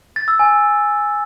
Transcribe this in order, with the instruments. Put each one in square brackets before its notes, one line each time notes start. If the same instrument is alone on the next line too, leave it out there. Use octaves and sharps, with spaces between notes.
[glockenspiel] A6
E6
G#5